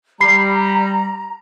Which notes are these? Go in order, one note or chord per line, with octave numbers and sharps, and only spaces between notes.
G3 A#5 B5 C7